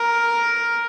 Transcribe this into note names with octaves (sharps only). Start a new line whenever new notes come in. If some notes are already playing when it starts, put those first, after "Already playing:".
Already playing: A#4